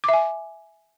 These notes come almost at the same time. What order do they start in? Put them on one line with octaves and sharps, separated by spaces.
D6 E5 G#5